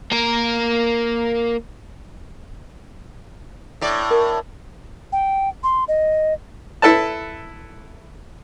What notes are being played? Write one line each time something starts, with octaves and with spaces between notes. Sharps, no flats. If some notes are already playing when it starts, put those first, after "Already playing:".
A#3 A#4
A2 D5
A#4
G5
C6
D#5
E4 A4 B4 A5